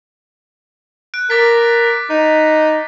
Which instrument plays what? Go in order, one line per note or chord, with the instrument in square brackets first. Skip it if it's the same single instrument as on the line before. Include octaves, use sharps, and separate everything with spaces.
[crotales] F#6 D7
[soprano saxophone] A#4 [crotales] D6 A6 B6
[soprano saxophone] D#4